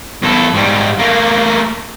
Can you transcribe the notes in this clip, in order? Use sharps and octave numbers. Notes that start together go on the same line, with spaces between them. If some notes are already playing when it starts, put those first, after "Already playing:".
E2 A4
G#2 G3
A3 A#3